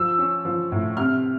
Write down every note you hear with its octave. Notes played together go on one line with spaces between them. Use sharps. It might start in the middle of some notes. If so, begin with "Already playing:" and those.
Already playing: F3 E6
C#4
F3
A2
C3 F6